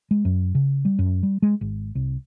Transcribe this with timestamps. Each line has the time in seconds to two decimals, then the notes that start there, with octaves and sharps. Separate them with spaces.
0.11 G#3
0.25 F#2
0.55 C#3
0.85 G3
0.99 F#2
1.23 G3
1.42 G#3
1.61 G#1
1.95 C2